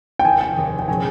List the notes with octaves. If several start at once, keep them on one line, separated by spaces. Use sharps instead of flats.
G5
F1 D#2 D#3 G#5
G5
F1 D#2 D#3
G5
A#2 F3 G#3 C#4 G#5